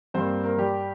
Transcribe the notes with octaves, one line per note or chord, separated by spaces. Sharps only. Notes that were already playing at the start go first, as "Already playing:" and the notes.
G2 G3 A#3 C4 C5
A#3 A#4
G3 G4